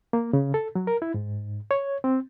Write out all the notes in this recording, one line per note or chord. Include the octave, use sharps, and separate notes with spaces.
A#3
C#3
A4
F#3
A#4
E4
G#2
C#5
C4